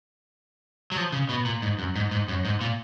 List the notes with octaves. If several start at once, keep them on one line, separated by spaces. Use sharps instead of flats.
F#3
F3
C#3
B2
A#2
G#2
F#2
G#2
G#2
F#2
G#2
A#2